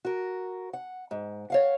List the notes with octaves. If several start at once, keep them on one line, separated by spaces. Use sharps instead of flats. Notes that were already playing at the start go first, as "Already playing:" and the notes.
F#4 A#4
F#5
G#2
C#5 F5 F#5